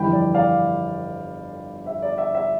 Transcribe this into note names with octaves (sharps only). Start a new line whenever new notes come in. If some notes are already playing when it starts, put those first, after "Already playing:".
Already playing: G1 F2 E3 G3 G5 B5
D5
D5 F5
E5
D5
E5
E5